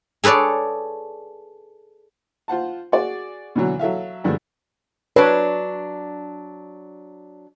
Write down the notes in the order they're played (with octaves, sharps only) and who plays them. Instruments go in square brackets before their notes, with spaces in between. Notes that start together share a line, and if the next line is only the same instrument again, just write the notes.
[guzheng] G#4 A4 B4 C#5 D5
[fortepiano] F4 C5 F#5 A5
F#4 G#4 D5
B2 D3 E3 F#3
F#3 A4 E5 F5
G2 D3 F3 G#3 A3
[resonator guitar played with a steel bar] F#3 D4 [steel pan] B4 C#5